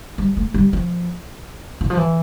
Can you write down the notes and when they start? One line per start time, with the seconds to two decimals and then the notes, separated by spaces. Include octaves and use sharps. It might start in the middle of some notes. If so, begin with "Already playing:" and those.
0.18 G3
0.37 A3
0.54 G3
0.73 F3
1.81 E3
1.90 F3
1.97 E3